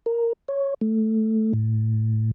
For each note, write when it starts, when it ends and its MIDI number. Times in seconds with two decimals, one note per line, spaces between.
0.06 0.33 70
0.48 0.74 73
0.81 1.53 57
1.53 2.31 45